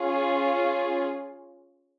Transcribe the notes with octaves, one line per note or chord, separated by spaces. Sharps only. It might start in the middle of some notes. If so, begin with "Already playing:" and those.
Already playing: C#4 F4 G#4